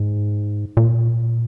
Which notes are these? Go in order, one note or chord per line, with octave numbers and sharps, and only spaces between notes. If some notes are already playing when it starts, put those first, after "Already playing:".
Already playing: G#2
A#2